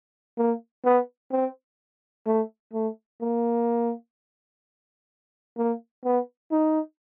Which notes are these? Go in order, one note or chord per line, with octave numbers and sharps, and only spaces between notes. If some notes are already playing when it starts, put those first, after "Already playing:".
A#3
B3
C4
A3
A3
A#3
A#3
B3
D#4